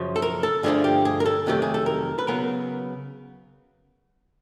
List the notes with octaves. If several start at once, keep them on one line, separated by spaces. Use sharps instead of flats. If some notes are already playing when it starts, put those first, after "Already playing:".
Already playing: F#2 C#3 F3
A4
A#4
A4
G2 D3 F3 A3 D4 G#4
G4
G#4
A#4
A4
F2 C3 D#3 F#3 A3 G4
G#4
A4
A#4
B4
C#3 F#3 B3 A#4